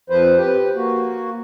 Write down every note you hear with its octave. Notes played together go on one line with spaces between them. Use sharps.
F2 F3 B4 C5
G4 B4
A#3 F#4